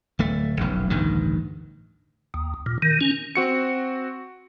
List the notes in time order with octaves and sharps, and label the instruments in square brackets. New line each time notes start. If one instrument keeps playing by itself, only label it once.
[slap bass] D1 A3
F1 B1 F#2
A1 D2 G2 D#3
[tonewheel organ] D#2
A#2
D#3
C#4
[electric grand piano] C4 F#4 C#7